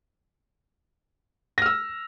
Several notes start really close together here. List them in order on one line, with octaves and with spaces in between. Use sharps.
A#6 F6 E6